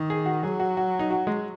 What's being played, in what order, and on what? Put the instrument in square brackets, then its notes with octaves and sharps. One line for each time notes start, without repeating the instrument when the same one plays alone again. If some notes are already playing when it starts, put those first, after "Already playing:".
Already playing: [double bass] D#3
[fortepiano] G#4
F#4
[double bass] F#3 [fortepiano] G#4
[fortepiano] F#4
F#4
D#4
F#4
G#3